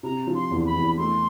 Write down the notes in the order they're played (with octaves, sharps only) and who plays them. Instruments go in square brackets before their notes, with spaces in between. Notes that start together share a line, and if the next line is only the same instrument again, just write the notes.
[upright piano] C3 [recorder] A#5
[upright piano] F3
[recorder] C6
[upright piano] E2
[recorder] B5
[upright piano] E2
[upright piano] A3 [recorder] C6